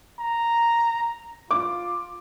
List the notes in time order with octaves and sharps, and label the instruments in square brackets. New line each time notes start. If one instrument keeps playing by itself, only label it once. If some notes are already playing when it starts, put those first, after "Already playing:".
[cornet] A#5
[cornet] F4 [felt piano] D6